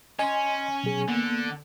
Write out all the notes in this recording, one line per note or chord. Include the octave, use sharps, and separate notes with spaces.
C#4 D#5 G#5 C6
B2 F#3 G#4
D3 A#3 B3